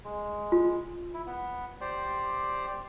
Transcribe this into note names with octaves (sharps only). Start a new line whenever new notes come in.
G#3
F4
E4
B3
G4 C5 D5